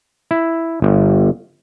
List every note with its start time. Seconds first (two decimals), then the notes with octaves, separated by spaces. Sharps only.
0.31 E4
0.82 G1